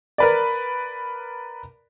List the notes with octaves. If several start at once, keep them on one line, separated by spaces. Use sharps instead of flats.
A#4 B4 D5